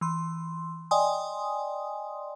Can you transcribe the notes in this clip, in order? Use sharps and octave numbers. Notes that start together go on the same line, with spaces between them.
E3 C6
D5 D#5 G5 G#5 C6 D#6